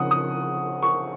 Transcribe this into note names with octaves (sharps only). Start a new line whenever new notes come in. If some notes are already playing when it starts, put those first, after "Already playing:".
Already playing: C#3 F3 C4 D#4 F#5 D#6
D#6
C#6